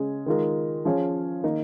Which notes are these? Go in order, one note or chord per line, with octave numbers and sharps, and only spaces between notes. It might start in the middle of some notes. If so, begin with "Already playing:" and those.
Already playing: C#3 G#3 C#4 G#4
D#3 G#3 F4 A#4
F3 C#4 G#4 C#5 F5
D#3 A#3 D#4